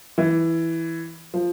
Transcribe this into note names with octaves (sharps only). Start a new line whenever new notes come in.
E3
F3